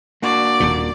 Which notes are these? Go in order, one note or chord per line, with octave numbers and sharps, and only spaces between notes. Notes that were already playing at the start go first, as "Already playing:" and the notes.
A#3 D4 F#4 D5
D#1 D#2 A#2